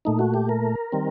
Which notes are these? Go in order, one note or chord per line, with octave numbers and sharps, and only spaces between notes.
A#2 A3 D#4
F#4
G4
A#4
D#3 G3 C4